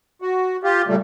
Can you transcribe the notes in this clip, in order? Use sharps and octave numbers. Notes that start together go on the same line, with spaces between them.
F#4
F4 G4
A#2 C#3 G3 A3